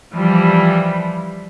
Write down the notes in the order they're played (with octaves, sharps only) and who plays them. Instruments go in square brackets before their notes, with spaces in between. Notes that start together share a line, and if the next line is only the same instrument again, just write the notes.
[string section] E3 F3 G3